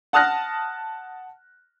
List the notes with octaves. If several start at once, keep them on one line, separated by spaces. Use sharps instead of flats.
F#5 A5 D#6 F6 F#6 A#6